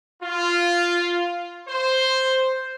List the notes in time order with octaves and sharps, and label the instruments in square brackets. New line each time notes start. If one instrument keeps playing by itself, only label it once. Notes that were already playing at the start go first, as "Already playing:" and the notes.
[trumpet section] F4
C5